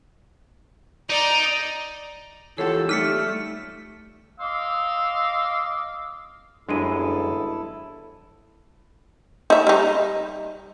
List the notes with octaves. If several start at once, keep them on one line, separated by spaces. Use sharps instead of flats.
D#4 D5 A#5
E3 F4 G4 A4 C#5 F#5
G3 A3 D#4 D5 F6 B6 C#7
D#5 F5 C6 D6 E6
G1 F#2 G#3 D4 E4 A4 D#7
D#4 E5
G3 D#4